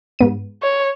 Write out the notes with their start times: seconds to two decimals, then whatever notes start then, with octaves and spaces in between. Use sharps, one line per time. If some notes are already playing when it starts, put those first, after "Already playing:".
0.19 G#2 B3 D#7
0.63 C#5